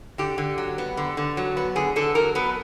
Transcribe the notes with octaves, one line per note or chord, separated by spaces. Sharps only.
D3 G4
D3
F#3
B3
D3
D3
F#3
B3
D3 G#4
D3 A4
F#3 A#4
B3 B4